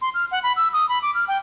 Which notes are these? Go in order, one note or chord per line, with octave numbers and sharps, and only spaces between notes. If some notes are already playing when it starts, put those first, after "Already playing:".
C6
F6
F#5
B5
E6
D#6
B5
D6
F6
G5